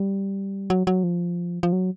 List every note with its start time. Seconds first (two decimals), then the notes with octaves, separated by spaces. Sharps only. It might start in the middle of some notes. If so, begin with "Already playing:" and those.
Already playing: G3
0.70 F#3
0.87 F#3
1.03 F3
1.63 F3
1.73 F#3